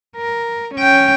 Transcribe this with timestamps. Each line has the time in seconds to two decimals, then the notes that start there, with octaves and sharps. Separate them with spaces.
0.16 A#4
0.75 C#4 G5